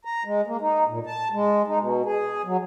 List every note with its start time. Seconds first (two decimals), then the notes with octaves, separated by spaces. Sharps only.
0.05 A#5
0.25 G#3
0.47 A#3
0.61 D#4
0.88 A#2
1.06 A5
1.32 G#3
1.67 D#4
1.79 B2
2.05 G#4
2.45 F#3